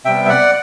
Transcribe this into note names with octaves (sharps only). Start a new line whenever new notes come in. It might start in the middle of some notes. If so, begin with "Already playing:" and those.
C3 G3 B3 E5 G5
E5
D5 F#5